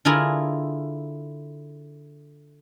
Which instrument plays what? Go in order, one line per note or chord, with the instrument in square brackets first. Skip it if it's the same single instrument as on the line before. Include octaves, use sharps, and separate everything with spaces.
[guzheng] D3 E4 F4 G#4 A#4